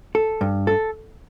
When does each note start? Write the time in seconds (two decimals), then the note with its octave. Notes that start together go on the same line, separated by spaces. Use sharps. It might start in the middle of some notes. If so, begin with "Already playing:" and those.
0.15 A4
0.41 G2
0.67 A4